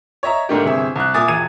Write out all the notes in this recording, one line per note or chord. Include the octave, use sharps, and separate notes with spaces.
C#5 D#5 E5 A#5
G#2 D3 A3 A#3 D4 G4
G1 C3 G#4 E5
C2 F#6
A#2 E5 G#5 D6 D#6 A6
E1 G#6 D#7